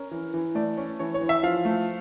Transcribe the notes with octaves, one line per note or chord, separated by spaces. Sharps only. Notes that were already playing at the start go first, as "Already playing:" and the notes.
Already playing: C#4 A#4
E3
E3
A3 D5
C#4
E3 C#5
C#5
E3
E5
F3 F5
A3